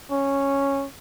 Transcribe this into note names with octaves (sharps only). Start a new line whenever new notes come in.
C#4